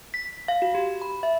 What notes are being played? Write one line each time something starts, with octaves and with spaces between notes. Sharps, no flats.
B6
F5
F#4
G4
B5
E5